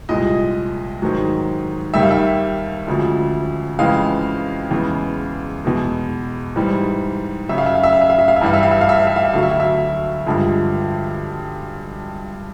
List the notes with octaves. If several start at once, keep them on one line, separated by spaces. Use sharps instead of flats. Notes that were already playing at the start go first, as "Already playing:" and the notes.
C2 A#2 F3 G#3 D#5
G#2 D#3 F#3
D#2 D#3 G3 E5
F5
E5
D2 C#3 F3 G#3
F2 C#3 E3 G#3 F5
E2 C#3 E3 G#3
E2 B2 G#3
G#2 E3 G3
F#2 C#3 F#3 E5
F5
E5
F5
E5
F5
E5
F5
E5
F5
E5
G2 E3 G3 F5
E5
F5
E5
F5
E5
F5
E5
F5
E5
D2 D3 F#3 F5
E5
F5
E5
G2 D3 F3 G#3